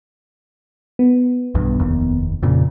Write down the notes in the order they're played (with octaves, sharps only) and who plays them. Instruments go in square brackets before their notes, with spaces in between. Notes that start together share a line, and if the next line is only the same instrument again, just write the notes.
[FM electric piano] B3
[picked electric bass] B1 E2 G2
F1 D#2
F2 A#2 C#3